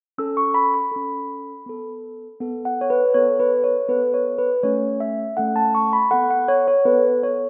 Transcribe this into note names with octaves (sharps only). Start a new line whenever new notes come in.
C#4 A4 E6
C#6
B5
B5
C#4 A4
B3 A4
B3 A4
F#5
C#5
B4
B3 A4 C#5
B4
C#5
B3 A4 B4
C#5
B4
A3 C#4 A4 C#5
E5
A3 C#4 A4 F#5
A5
C#6
B5
B3 A4 F#5
F#5
C#5
C#5
B3 A4 B4
C#5